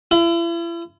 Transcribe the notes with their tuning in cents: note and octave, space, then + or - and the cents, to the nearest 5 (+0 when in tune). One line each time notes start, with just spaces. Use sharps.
E4 +40